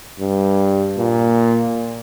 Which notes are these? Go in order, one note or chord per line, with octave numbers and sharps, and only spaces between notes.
G2
A#2